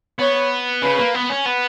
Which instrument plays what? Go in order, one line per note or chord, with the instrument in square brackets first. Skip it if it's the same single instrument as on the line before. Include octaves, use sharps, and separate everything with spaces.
[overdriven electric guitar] B3 [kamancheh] C#5
[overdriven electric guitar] C#3 [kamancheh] B4
[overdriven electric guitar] A#3
B3
C#4
B3